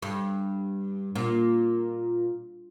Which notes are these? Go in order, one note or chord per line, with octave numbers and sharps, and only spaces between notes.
G2
A#2